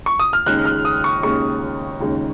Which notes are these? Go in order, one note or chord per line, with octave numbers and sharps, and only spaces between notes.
C#6
D#6
F6
D#2 C#3 G#3 D#4 F#6
F6
D#6
C#6
D#2 C#3 G#3 D#4 C#6
D#2 C#3 G#3 D#4